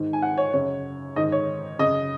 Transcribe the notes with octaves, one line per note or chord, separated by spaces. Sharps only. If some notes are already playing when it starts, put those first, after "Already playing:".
Already playing: G#2 D#3
G#5
F#5
C#5
F#2 C#3 C#5
G#2 D#3 D#5
C#5
F#2 C#3 D#5